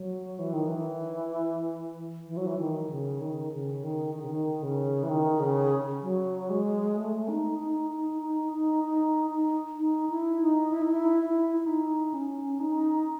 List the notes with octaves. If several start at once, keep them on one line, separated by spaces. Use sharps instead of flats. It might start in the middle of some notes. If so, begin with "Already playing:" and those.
Already playing: F#3
E3
D#3
E3
E3
F#3
E3
D#3
C#3
D#3
C#3
D#3
D#3
C#3
D#3
C#3
E3
D#3
C#3
F#3
G#3
A3
D#4
D#4
D#4
D#4
D#4
D#4
D#4
D#4
E4
D#4
E4
D#4
E4
E4
E4
D#4
C#4
D#4